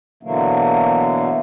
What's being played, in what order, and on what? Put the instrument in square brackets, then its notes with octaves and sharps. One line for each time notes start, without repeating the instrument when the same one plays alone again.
[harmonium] B2 D3 E3 F#3 A3 A#3